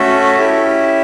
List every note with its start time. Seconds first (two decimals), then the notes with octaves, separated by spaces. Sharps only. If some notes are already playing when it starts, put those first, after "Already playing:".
Already playing: A3 C#4 F#4 A4 E5
0.39 C#4 E4 G4